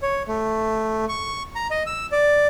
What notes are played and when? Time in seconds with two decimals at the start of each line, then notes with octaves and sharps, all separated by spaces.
0.02 C#5
0.28 A3
1.09 C#6
1.56 A#5
1.71 D#5
1.86 E6
2.12 D5